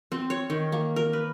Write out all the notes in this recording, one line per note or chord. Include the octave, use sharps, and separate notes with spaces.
C4
C#5
D#3
A#3
A#4
B4